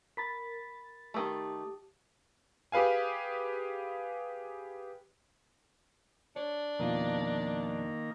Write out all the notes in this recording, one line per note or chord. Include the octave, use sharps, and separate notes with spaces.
A#4 B5 A6 B6
D#3 A3 G4 A5 D#6
G4 G#4 B4 F5 G#5
D4 C#5
F2 B2 D#3 A#3 F4